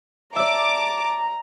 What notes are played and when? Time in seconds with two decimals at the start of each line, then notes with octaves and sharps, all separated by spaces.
0.36 D5 E5 A5 A#5 D6